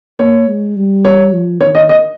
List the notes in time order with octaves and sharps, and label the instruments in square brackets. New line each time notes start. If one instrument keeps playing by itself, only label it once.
[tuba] A#3 [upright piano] C#5
[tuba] G#3
G3
[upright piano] C#5
[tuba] F3
[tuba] D#3 [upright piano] C#5
[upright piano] D#5
D#5